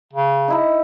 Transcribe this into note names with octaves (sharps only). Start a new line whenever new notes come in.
C#3
D#4 E4 A#5